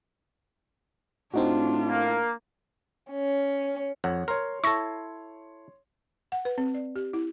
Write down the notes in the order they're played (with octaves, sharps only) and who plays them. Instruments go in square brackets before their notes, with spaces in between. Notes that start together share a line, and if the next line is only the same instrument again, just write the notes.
[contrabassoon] A2 [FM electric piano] C4 D#4 F#4 [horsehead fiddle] D4 F4
[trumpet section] A#3
[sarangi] C#4
[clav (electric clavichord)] F2 [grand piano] C#5 F#5
[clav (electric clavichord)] A#4 [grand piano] C#5 C6
[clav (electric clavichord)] E4 A4 [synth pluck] C#6 A#6
[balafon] F#5
B4
C4
D5
G4
E4